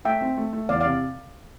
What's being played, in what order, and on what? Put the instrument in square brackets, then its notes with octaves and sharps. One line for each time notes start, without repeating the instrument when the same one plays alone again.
[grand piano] A3 [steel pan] E5 G5
[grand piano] C4
A3
A3
[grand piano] E2 [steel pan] D5 F5
[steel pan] D5 F5
[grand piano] C3